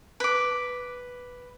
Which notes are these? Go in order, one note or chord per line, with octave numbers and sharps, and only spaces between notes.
B4 D6